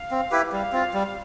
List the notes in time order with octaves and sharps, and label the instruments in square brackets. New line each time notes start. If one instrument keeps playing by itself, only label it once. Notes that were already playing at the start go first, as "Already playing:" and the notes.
Already playing: [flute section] F5
[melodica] C4
E4 G4 B4
[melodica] G3 [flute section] F5
[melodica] C4 F4
G3